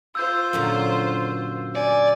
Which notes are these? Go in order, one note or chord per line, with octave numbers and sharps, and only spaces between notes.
F4 C5 E6 G6
F#2 A#2 D3
D5 G#5